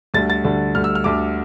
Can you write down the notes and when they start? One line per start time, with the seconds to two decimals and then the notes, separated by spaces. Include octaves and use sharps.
0.14 D2 D3 G3 A6
0.30 A6
0.44 D2 D3 G3
0.75 D2 D3 G3 F6
0.84 E6
0.95 F6
1.04 D2 D3 G3 D6